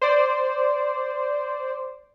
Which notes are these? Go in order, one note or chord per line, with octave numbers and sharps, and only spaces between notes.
C5 D5